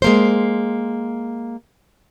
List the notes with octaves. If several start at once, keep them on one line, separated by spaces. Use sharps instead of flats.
G#3 A#3 C5